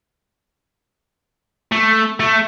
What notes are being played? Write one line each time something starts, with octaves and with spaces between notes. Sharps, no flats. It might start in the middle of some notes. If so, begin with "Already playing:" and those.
A3
A3